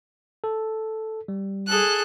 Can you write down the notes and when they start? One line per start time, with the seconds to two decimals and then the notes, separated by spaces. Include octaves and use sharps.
0.44 A4
1.28 G3
1.67 G#4 A4 F#6